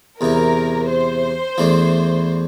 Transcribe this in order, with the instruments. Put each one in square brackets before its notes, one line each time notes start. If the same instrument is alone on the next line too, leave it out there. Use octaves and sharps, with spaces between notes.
[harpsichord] E2 C3 E3 [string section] A#4
[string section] C5
[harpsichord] E2 E3 A3 D4